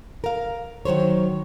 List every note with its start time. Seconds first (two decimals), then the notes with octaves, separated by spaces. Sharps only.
0.24 A#4 F5
0.85 D#3 F#3 C5 C#5